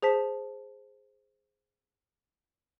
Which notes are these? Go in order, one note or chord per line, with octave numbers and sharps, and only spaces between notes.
G#4 C5 A5 B6